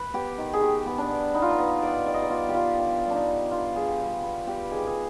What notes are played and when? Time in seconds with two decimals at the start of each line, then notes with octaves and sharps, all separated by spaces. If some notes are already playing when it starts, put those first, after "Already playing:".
Already playing: B4
0.14 B3 G4
0.38 D#3
0.53 G#4
0.61 D#3 G4
0.86 B3
0.98 D4
1.10 B3
1.34 B3 D#4
1.42 F4
1.50 D#4
1.58 B3 B4
1.82 D#3 D5
2.06 D#3 D5
2.14 D#5
2.22 D5
2.30 B3 F4
2.49 G4
2.55 B3 F4
2.79 D3
3.02 G3
3.10 D4 D#4
3.27 B3
3.51 D3 F4
3.75 D3 G#4
3.87 G4
3.99 G3
4.23 B3 B4
4.47 B3 G4
4.71 D#3 G#4
4.86 G#4